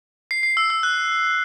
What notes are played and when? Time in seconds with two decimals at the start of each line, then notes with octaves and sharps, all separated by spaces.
0.31 C7
0.43 C7
0.57 E6
0.70 E6
0.83 F#6